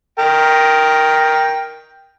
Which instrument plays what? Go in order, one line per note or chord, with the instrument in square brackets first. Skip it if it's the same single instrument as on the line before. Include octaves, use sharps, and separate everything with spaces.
[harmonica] A#4 G5